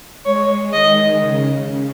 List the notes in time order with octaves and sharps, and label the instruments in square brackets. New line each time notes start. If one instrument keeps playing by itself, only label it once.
[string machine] G#3 [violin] C#5
[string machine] D#3 [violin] D#5
[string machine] C#3